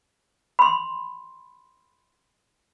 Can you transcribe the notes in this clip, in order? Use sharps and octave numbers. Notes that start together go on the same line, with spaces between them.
B5 C6